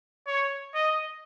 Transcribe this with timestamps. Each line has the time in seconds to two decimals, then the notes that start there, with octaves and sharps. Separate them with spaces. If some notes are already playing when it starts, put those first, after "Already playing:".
0.27 C#5
0.75 D#5